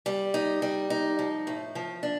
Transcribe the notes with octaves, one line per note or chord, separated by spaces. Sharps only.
G3
D#4
G3
D#4
F3
A2
F3
D4